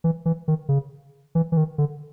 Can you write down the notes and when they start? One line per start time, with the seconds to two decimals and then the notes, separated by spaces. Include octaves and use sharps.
0.04 E3
0.26 E3
0.48 D#3
0.69 C#3
1.35 E3
1.52 E3
1.57 D#3
1.78 D3